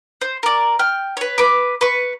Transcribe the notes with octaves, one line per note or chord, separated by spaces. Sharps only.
C5
A#4 D5
G5 F6
B4 C#5
B4 D6
B4 C#6